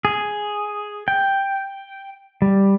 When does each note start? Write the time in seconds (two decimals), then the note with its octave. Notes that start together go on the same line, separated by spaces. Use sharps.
0.05 G#4
1.08 G5
2.42 G3